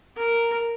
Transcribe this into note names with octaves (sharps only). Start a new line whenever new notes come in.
A#4